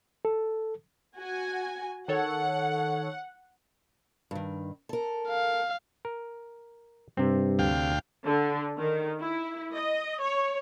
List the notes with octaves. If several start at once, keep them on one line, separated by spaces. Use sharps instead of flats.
A4
F#4 G#5
D#3 A4 C#5 F#5
G2 D#3
A4 A#4
F5
A#4
G2 C3 C4
D2 F5 G5
D3
D#3
E4
D#5
C#5